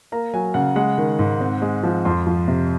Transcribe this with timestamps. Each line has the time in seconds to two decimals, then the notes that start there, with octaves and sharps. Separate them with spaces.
0.12 A#3 A#5
0.34 F#3 G#5
0.54 C#3 F#5
0.76 G#3 F#5
0.98 D#3
1.19 G#2
1.40 C4
1.62 G#3
1.83 F3
2.05 F2 C6
2.27 F3
2.48 C3